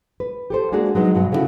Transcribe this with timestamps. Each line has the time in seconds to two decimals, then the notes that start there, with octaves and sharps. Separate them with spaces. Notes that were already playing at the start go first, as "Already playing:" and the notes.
0.20 B4
0.50 G4 A4 C5
0.72 G#3 A#3 D4 F#4 G#4
0.95 F#3 G#3 B3 D#4
1.14 G2 B2 F#3
1.32 C#3 A3 B3 C#4 E4 F#4